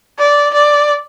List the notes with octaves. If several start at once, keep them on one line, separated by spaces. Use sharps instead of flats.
D5
D5